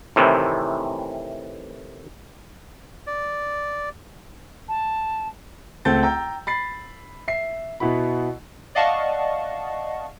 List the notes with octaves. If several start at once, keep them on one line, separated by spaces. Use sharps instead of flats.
A2 C3 D#3 E3
D5
A5
C#2 A3 C4 G6 A6
G5 A#5 E6 G6
B5 A6 C7
E5 C7
B2 B3 E4 F#4 B5
D5 D#5 F5 F#5 A5 C#6